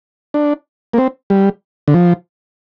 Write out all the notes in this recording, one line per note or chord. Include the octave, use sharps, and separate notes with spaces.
D4
A#3
C4
G3
D3
F3